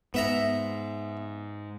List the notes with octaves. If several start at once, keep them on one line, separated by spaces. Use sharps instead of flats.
G#2 B3 E5 A#5